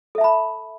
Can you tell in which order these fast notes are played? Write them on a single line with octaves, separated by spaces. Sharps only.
A4 E5 A5 B5